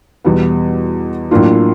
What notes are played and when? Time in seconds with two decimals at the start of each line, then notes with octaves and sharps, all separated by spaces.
0.25 E2 B2 G3 B3
1.31 A2 F#3 A#3 D4 F4